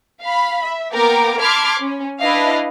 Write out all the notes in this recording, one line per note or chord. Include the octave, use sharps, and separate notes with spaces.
F5 B5
E5
A#3 B3 A#4 G5 D6
A5 B5 C6 D6 F6 G#6
C#4
D4 E4 B4 D#5 F5